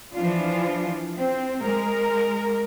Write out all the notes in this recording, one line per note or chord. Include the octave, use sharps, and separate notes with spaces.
E3 F3 D4 F4
C4
G#3 A#4